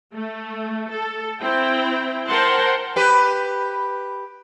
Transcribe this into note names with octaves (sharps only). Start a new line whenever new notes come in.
A3
A4
C4 E4 G5
A#4 C5 F#5 G5 A5 C6
G4 B4